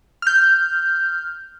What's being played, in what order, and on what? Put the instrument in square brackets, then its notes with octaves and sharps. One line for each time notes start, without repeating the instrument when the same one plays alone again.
[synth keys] F6 G6